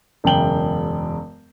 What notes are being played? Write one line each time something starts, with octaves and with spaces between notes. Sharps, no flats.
E1 F#2 C#3 G5 F#7 G7